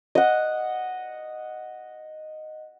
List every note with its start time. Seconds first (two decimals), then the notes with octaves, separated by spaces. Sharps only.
0.15 D#5 F#5